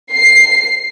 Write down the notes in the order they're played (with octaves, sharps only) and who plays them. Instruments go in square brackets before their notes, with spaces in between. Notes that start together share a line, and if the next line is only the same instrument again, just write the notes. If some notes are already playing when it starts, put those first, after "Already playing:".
[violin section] C7